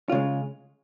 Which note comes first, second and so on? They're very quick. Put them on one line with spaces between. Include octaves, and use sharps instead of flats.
F4 C#3 G#3